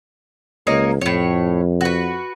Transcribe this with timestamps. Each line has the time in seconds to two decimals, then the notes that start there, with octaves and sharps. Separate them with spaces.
0.67 C#2 A#3 C#5 D#5
1.01 F2 A2 C#5
1.81 F#4 B4